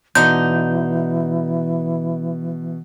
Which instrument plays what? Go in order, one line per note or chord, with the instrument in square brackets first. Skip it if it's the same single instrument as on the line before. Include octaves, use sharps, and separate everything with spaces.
[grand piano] B2 [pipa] D3 D#4 [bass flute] E3 [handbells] G6